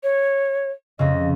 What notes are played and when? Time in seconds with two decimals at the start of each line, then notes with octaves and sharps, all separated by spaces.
0.03 C#5
0.99 F2 C#3 D#5